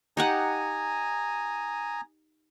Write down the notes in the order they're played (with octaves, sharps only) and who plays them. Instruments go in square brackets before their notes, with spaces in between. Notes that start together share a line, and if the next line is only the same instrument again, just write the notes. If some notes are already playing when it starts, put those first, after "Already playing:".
[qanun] D#4 G4 F#5 [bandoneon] G#5 A#5 D#6